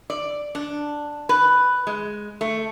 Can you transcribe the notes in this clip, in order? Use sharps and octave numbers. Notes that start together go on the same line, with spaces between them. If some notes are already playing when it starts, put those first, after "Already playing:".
D5
D4
B4
G#3
A3